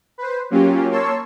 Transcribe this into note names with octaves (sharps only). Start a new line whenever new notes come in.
B4 C5
F#3 A#3 C#4 F4 G4
A#3 C#5 A5 C6 C#6 E6